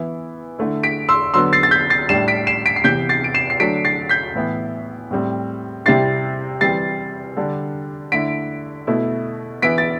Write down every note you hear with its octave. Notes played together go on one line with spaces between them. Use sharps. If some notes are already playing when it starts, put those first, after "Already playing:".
Already playing: E3 B3 E4
D3 A3 E4
B6 D7
C6 E6
D3 F#3 B3 C6 E6
A6 C7
A6
G6 B6
A6 C7
A2 G3 D4 C7 E7
B6 D7
C7 E7
B6 D7
C7
C3 E3 B3 G6 B6
A6 C7
D7
C7 E7
C7
D3 F#3 A3 D4 B6 D7
A6 C7
G6 B6
A2 E3 B3 E4
A2 G3 C4
C3 G3 C4 E4 A6 C7
E3 G3 C4 A6 C7
D3 G3 D4
D3 A3 E4 B6 D7
B2 A3 E4
E3 B3 E4 B6 D7
A6